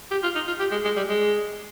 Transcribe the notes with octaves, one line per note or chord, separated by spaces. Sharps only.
G4
F4
D#4
F4
G4
G#3
G#3
G3
G#3